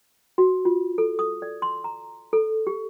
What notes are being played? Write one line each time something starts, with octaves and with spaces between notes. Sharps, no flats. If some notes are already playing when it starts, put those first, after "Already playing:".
F#4
F4
A4
D#6
D5
C6
A#5
A4
G4